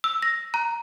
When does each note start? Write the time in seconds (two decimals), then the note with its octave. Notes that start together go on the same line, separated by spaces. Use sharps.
0.04 E6
0.22 A#6
0.54 A#5